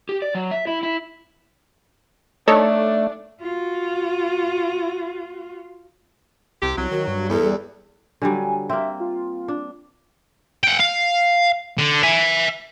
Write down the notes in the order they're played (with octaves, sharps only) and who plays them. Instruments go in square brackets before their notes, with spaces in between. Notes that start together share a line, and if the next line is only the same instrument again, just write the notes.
[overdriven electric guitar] G4
D5
F#3
E5
E4
E4
[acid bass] A3 [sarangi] D4 [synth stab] D#4 A4 C#5
[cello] F4 F#4
[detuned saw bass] C2 [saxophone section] C3 G4
[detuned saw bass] C2 [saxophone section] F#3
[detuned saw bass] D#3 [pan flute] F#4
[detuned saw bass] G2
[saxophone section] E2 [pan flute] A4
[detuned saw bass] G3
[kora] D3 F#3 G3 [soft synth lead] G#5
[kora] A#3 C4 [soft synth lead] E5
[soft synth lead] F4
[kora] D4
[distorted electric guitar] F#5 G5
F5
D3
E5 G#5